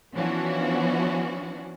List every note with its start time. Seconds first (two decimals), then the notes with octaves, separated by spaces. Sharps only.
0.14 E3 F3 B3 C#4 D4 F#4